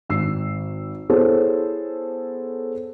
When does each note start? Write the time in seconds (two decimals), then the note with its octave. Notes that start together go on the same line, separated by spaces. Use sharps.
0.09 G#1 E6 C7
1.09 B3 E4 G#4 A4 C5 C#5